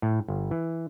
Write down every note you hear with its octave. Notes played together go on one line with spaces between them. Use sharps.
A2
G1
E3